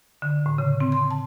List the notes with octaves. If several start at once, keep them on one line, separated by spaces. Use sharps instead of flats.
D3
A2
C#3
C4
C6
A5